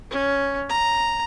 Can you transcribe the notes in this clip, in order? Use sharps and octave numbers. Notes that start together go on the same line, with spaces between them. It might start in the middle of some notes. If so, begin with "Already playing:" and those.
C#4
A#5